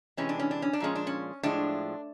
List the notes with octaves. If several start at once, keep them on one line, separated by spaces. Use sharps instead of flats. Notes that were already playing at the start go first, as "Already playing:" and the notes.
C3 E3 G#3 C#4
D4
C#4
D4
C#4
D4
A#2 F3 G#3 C#4
D4
C#4
A2 F3 G#3 D4